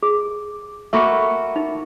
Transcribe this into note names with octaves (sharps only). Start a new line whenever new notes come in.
G#4
A3 A#3 F#4 E5 B5 C#6
D#4